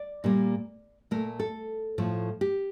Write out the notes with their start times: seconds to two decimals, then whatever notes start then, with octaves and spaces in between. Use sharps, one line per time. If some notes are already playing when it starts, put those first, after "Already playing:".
Already playing: D5
0.24 A#2 G3 A#3
1.11 A#2 A3 A#4
1.40 A4
1.98 A2 F3 A3
2.41 G4